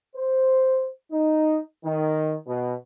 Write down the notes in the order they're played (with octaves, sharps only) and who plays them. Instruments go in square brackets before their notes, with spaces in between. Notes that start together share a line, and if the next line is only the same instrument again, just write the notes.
[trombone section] C5
D#4
D#3
B2